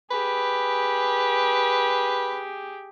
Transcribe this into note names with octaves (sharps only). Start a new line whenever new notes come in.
G4 G#4 B4